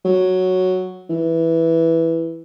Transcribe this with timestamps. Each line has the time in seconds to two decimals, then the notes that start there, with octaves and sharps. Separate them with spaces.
0.05 F#3
1.10 E3